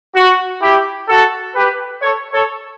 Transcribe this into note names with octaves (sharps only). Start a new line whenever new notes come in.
F#4
E4 G4
F#4 A4
G4 B4
A4 C#5
A4 C#5